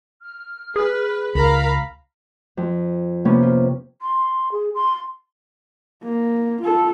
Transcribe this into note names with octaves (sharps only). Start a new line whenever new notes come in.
F6
G#4 B4
C#2 A#4 F5 A#5 B5
F2
C3 A#3 B3 C#4
F4
C6
G#4
C6
A#3
F4 A4